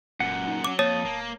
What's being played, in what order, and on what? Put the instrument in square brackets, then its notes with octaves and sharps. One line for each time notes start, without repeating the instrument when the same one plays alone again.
[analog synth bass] D#1 [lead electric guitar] F#2 A#2 [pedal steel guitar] F#5
[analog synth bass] D#4
[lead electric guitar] F#3 [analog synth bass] C#4 [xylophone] D6
[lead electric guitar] F2 [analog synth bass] A#3 [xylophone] C#5 [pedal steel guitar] A5 D#6
[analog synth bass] D1 [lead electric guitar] A#3